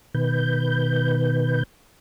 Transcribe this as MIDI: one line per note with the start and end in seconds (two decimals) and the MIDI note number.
0.14 1.63 47
0.14 1.63 51
0.14 1.63 71
0.14 1.63 91